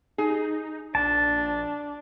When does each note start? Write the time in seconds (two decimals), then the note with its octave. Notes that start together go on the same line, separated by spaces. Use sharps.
0.18 D#4 G#4
0.95 A#1 D4 A5